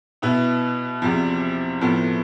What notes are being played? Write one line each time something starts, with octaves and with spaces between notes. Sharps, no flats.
B2 B3 E4
E2 C3 F3
A2 F3 B3